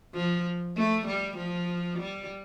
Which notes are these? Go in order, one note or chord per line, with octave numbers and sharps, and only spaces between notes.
F3
A3
G3
F3
G3